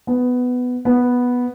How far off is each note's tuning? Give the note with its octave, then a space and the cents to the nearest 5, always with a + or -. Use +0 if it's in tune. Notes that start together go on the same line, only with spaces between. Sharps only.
B3 +10
B3 -5